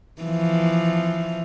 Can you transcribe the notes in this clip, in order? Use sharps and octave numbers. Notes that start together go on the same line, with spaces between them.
E3 F3